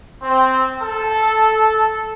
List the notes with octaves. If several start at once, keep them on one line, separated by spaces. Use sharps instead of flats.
C4
A4